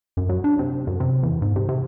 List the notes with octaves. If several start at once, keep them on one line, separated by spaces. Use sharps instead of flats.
F#2
F#3
D4
C3
F#2
C3
E2
G#2
C3
C3